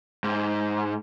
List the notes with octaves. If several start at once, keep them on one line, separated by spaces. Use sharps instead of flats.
G#2